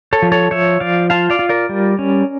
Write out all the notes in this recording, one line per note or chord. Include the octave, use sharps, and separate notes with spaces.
A4 C#5
F3
A4 C#5
F3 C#5 E5
F3 D5 F5
F4 F5 A5
D5 F5
F4
A#4 D5
G3
C#4